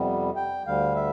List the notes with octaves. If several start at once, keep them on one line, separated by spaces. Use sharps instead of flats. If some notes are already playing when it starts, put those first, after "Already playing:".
Already playing: F2 C3 G3 B3
G5
D2 D3 G3 F5
E5